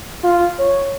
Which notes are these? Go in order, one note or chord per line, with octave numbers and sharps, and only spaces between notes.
F4
C#5